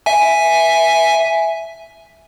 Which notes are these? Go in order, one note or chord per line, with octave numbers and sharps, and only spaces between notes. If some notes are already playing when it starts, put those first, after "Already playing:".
E5 G#5